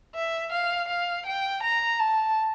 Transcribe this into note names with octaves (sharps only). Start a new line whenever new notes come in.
E5
F5
F5
G5
A#5
A5